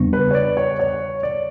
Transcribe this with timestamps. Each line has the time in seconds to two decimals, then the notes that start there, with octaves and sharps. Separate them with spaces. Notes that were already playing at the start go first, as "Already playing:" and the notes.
Already playing: E2 C#3 G3 B3 D4
0.13 B4
0.31 C#5
0.35 D5
0.57 C#5
0.80 C#5
1.23 D5